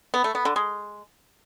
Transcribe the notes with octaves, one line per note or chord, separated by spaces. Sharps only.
B3
A3
B3
D3
G#3